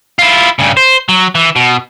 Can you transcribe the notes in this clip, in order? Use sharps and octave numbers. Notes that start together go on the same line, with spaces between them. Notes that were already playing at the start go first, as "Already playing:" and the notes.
E4 F4
G2 C#3
C5
F#3
E3
B2